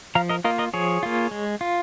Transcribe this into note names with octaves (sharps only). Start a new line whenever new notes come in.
F3 F5 A#5
A#4 D#5
A#3 F4 A#4 D#5
A#4 D#5
F3 G#4 C#5
A#3 F4
G#3
F4